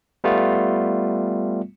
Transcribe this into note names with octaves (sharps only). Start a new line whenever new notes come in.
G3 A3 B3 F4